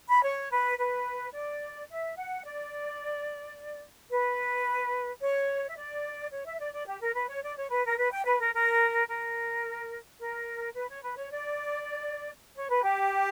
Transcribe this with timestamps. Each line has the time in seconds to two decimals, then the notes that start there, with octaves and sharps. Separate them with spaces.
0.09 B5
0.23 C#5
0.50 B4
0.77 B4
1.33 D5
1.89 E5
2.16 F#5
2.44 D5
4.10 B4
5.20 C#5
5.68 E5
5.77 D5
6.31 C#5
6.45 E5
6.59 D5
6.73 D5
6.87 G4
7.01 A#4
7.14 B4
7.28 C#5
7.42 D5
7.57 C#5
7.70 B4
7.84 A#4
7.97 B4
8.12 G5
8.25 B4
8.40 A#4
8.53 A#4
9.09 A#4
10.19 A#4
10.75 B4
10.88 C#5
11.02 B4
11.17 C#5
11.30 D5
12.55 C#5
12.69 B4
12.83 G4